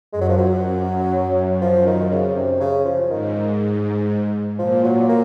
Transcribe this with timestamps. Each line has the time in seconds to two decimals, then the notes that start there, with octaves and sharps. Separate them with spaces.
0.13 F#2 G#3
0.21 F#3
0.29 F3
0.37 F#3
1.61 F3
1.87 D#3
2.11 C#3
2.36 C3
2.60 C#3
2.85 F3
3.10 G#2 D#3
4.59 A#2 F3
4.84 F#3
5.09 A#3